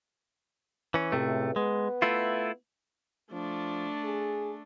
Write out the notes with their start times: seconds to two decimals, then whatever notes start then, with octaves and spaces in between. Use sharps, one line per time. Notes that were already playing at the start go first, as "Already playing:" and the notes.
0.94 E3 C#4
1.12 C#2 A2 C3 A3
1.56 G#3 B3
2.02 A3 E4 F4
3.32 F3 A3 D4
4.04 G#4